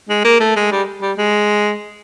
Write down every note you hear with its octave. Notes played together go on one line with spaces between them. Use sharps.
G#3
A#3
A3
G#3
G3
G3
G#3